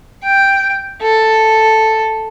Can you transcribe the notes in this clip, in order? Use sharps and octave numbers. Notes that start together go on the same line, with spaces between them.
G5
A4